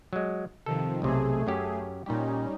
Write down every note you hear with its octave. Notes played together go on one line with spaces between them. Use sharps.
F#3 G#3
C3 D#3 F3 A4
B1 C3 A3 G#4
F#2 C#4 G4
A#2 G3 C#4 D#4 G4